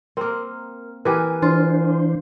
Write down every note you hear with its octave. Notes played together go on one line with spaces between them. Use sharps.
A#3 C4 A#4
E3 G4 A#4 B4 G#5
E3 D4 F4 C5